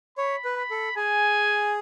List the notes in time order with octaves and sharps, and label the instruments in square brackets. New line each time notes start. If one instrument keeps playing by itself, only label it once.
[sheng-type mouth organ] C#5 [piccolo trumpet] B5
[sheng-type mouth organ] B4
[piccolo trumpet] B5
[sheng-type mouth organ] A4
[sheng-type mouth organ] G#4 [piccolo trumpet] G#5